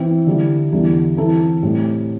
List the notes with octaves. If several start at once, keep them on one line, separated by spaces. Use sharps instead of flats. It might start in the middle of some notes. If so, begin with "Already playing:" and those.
Already playing: E3 C4 E4
D3 G3 E4
E2 D3 G3 E4
E3 C4 E4 A4
A2 G3 C4